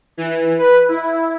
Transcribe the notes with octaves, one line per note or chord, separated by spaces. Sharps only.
E3
B4
E4